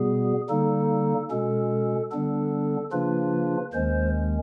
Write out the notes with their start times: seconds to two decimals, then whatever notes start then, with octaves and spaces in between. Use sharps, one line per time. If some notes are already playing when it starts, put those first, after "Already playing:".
Already playing: B2 G3 B3 G#4
0.49 D3 G3 A#3 D#4 A4
1.30 B2 G#3 C#4 A4
2.11 D3 G3 B3 D4 A4
2.92 C#3 F3 A#3 D4 F4 B4
3.73 D#2 D#3 G#3 C#4 C5